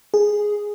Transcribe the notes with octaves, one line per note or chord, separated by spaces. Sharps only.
G#4